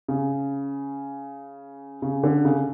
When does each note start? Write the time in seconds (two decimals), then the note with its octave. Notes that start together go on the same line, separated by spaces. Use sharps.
0.08 C#3
2.02 C#3
2.23 D3
2.45 C#3